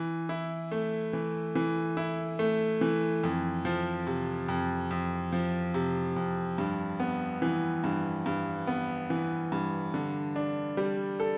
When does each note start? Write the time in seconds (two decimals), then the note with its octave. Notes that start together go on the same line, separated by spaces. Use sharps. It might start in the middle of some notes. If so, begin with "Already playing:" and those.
Already playing: E3
0.29 E4
0.72 A3
1.13 E3
1.55 E3
1.97 E4
2.39 A3
2.81 E3
3.24 F2
3.65 F3
4.07 C3
4.48 F2
4.91 F2
5.32 F3
5.74 C3
6.16 F2
6.58 G2
7.00 B3
7.42 E3
7.84 G2
8.26 G2
8.67 B3
9.10 E3
9.52 G2
9.94 D3
10.36 D4
10.77 G3
11.20 A4